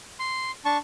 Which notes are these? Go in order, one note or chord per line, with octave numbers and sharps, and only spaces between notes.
C6
D4 A5 C#6